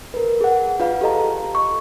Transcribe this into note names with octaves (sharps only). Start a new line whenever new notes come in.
A#4 B4
G#4 F#5
F4 B4 F5
G4 A4 D#5 A#5
C#6